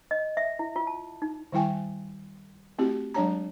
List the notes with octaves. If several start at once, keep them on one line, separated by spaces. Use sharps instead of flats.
D#5
E5
E4
F4
A5
D#4
D#3 G3 E4 G5 G#5
A3 C4 E4 F#4 G4
F#3 G#3 D4 C#5 A5 A#5